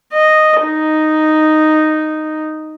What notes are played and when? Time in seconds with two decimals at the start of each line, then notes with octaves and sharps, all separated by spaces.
0.13 D#5
0.63 D#4